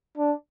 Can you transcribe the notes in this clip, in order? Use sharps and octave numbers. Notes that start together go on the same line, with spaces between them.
D4